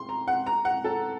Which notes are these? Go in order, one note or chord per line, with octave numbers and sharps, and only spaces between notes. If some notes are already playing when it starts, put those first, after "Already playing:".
Already playing: C6
A#5
F#5
A#5
F#5
A4